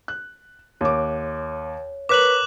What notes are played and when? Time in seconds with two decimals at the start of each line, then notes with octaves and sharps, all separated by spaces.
0.08 F#6
0.81 D#2 C#5 D6
2.09 A#4 B4 C#5 D6 F#6 B6 F#7